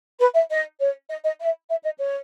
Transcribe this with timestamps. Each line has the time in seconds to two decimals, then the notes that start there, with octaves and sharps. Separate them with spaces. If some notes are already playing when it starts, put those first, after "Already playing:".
0.20 B4
0.34 E5
0.51 D#5
0.80 C#5
1.09 D#5
1.25 D#5
1.40 E5
1.69 E5
1.84 D#5
1.98 C#5